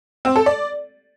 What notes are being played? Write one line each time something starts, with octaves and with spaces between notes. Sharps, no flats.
C4
A4
D5